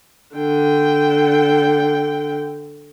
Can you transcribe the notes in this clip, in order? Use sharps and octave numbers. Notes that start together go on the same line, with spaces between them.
D3 G5